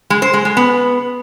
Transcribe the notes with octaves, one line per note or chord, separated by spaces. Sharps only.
G#3
C5
G#3
G#3
B3